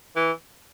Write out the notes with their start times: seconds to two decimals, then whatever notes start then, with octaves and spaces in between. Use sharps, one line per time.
0.16 E3